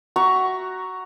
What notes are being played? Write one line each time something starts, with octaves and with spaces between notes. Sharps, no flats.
F#4 E5 A#5 C#6